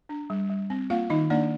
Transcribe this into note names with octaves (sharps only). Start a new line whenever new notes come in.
D4
G3
G3
C4
A#3 F4 F5
D#3 D#4 D#5
A#3 D4 D5